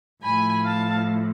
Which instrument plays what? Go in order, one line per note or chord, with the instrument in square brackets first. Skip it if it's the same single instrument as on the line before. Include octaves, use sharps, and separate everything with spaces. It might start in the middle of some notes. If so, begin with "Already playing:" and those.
[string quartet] A2 F3 G#5 B5
F5 A5